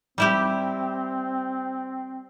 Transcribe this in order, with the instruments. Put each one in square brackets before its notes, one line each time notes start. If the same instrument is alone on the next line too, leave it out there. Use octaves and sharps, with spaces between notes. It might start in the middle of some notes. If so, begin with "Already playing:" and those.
[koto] G3 E4 G4 [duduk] C4